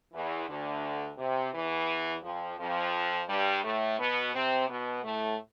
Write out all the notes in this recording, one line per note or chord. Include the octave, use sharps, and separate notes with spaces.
E2 E3
D2 D3
C3
E2 E3
F2 F3
F2 F3
G2 G3
A2 A3
B2 B3
C3 C4
B2 B3
A2 A3